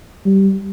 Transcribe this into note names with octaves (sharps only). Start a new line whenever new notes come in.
G3